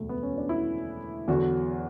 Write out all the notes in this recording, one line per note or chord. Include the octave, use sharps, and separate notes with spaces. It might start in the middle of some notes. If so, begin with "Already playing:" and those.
Already playing: E1 D2 D3 A3
B3
C#4
D4
E4
E2 D3 F#3 F#4